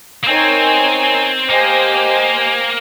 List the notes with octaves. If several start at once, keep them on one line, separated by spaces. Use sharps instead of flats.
A#3
C4 D#4 A#4 C#5 G#5
A#3 G4 C5 D#5 G#5